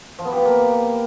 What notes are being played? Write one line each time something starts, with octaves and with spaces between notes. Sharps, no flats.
F3
B3
G4
B3
A#3